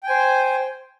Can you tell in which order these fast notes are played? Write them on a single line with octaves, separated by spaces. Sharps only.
G5 G#5 C5